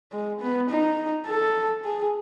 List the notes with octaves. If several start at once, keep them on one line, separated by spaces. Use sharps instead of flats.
G#3
B3
D#4
A4
G#4